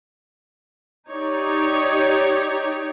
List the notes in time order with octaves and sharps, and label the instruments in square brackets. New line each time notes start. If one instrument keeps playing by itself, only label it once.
[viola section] D#4 G4 C#5 D5